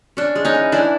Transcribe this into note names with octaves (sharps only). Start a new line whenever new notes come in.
C#4 D4
G#3
C#4 D#4
E3
E3 D4 E4